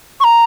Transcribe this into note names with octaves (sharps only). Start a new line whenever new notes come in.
C#6
A#5